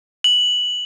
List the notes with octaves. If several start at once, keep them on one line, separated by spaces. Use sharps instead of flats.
F#7